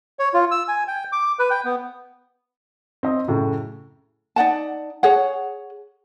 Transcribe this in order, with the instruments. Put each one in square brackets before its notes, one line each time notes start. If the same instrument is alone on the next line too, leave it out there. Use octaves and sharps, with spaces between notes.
[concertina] C#5
F4
E6
G#5
G5
D6
B4
G5
B3
[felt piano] C4 D#5
F#2 A2 C#3
[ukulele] D#4 D5 F#5 A5
G#4 C#5 F#5